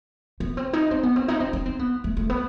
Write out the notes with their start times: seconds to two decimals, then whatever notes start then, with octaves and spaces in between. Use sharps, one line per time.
0.40 B3
0.57 C4
0.73 D#4
0.91 C4
1.03 B3
1.16 C4
1.28 D#4
1.40 C4
1.53 D#4
1.66 C4
1.79 B3
2.04 A3
2.17 A3
2.30 B3